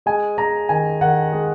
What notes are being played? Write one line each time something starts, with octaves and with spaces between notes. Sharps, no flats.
G#3 G#5
G#3 A#5
D#3 G#5
D#3 F#5
G#3